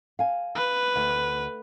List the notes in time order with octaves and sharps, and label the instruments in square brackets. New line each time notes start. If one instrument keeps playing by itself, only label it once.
[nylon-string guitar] F5 G#5
[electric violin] B4
[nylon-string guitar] D2